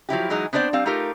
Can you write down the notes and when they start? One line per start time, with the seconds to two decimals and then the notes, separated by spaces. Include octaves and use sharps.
0.09 F3 F#3 E4 G4
0.30 E3 F#3 G#3 D#4
0.53 B3 C4 D4 C5 D5
0.73 G3 C4 F5
0.86 A3 D#4 F4 G4 A#4